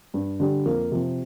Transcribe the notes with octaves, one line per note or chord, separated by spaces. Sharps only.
G2
D3 G3
F2 A#3
C3 F3